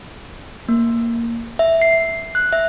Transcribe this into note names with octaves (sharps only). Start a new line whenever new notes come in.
A#3
E5
C7
F#6
E5